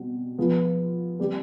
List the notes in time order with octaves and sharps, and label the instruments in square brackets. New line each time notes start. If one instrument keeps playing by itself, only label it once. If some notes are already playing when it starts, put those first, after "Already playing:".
Already playing: [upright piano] B2 G3 C4
F3 B3 F4 G#4
G3 C4 G4